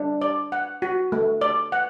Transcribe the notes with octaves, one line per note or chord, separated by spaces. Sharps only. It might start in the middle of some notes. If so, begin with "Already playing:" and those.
Already playing: D4
D5
F#5
F#4
A3
D5
F#5